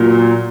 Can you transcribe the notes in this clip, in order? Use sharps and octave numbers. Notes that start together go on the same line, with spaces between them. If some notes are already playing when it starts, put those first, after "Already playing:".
Already playing: A#2 F#3